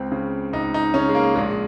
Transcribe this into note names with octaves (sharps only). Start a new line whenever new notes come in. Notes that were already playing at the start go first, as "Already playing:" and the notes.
Already playing: C#2 C4
C#3
C#2 D#4
D#4
C#3 C#4
G#3
A#3
A#1 G#3